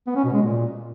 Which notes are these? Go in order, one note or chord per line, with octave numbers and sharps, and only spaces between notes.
B3
C#4
B2
G#3
A#2